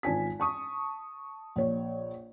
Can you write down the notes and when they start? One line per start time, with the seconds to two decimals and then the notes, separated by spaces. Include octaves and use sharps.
0.03 G#1 F4 G#5 A5 B6
0.40 A5 C#6 D#6
1.56 A#1 C#5